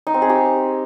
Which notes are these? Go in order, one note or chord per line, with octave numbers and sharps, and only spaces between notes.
D#4
C4
G#4
G4